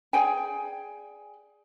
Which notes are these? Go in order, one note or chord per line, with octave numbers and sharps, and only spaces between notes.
G#4 D5 G5 G#5